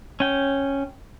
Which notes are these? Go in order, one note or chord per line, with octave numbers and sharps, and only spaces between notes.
C#4 G5